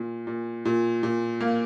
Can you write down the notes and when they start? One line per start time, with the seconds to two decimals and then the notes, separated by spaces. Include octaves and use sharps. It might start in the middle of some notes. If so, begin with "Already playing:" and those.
Already playing: A#2
0.27 A#2
0.65 A#2
1.03 A#2
1.41 A#3